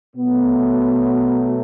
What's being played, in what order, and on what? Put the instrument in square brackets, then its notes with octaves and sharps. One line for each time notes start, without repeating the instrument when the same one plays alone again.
[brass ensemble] B2 F#3 A3 B3